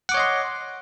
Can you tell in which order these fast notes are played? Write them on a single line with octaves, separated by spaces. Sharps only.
F#5 D6 C#5 D#5 C6